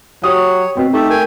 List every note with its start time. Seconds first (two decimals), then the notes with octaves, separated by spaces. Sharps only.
0.23 F#3 G4 C#5 D#6
0.77 B2 C4
0.93 A3 D#4 G4
1.10 A#4 G5 G#5